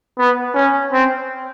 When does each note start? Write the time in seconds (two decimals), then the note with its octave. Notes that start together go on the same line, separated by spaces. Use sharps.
0.18 B3
0.55 C#4
0.93 C4